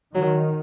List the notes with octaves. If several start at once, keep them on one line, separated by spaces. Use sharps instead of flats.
D#3 F#3